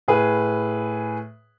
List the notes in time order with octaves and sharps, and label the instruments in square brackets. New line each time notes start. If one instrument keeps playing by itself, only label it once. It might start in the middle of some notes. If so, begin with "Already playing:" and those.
[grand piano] A2 G#4 B4